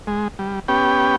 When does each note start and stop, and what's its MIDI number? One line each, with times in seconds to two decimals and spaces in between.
0.07 0.28 56
0.39 0.60 55
0.68 1.16 59
0.68 1.16 61
0.68 1.16 67
0.68 1.16 79